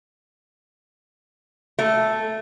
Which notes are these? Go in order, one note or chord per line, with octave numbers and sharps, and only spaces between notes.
A3